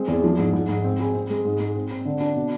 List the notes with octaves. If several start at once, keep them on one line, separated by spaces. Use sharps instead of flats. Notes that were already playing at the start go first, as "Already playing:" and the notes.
Already playing: G#3 C4
E2
F3
G#2
G#2
G#2
C4
G#4
C4
G#3
G#2
G#3
C4
C4
D3
D4
B2